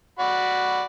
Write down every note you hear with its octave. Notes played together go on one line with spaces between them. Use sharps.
F#4 D5 B5